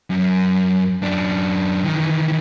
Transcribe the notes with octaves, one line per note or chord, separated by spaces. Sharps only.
F#2
F#2 D4
D#3 E3